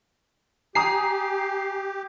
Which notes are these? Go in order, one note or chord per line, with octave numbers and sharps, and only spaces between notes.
G4 G#5 A#5 D#6 C7